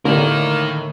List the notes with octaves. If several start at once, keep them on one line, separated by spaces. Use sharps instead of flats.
A2 D3 A#3 D#4 A#4